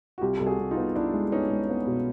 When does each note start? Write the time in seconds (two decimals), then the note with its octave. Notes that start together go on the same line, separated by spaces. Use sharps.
0.18 F#4
0.21 C2 F4 G4
0.37 C2 A4
0.47 F#4 G#4
0.59 C2
0.71 D#4 F4
0.77 B3
0.95 B3 D4 E4
1.14 G#3
1.32 B3 C#4 D#4
1.51 G#3
1.70 B3
1.87 B2